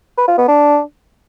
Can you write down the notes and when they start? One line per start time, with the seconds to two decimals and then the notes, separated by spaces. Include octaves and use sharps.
0.18 B4
0.28 F4
0.38 B3
0.48 D4